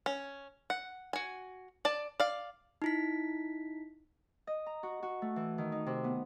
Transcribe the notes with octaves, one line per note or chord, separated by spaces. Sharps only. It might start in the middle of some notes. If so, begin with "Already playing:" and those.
C#4
F#5
F#4 G#5
D5 A5
D5 F5
D#4 E4 B6
D#5
A#5
F#4
F#4
A3
E3
D#3
D#4
C3
B3